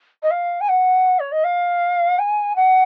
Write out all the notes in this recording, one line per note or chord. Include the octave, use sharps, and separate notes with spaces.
D#5
F5
G#5
F#5
C#5
D#5
F5
G#5
F#5